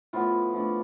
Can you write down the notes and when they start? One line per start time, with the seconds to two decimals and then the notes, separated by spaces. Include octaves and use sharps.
0.13 A2 F3 B3 E4 F4
0.54 F3 A3 D4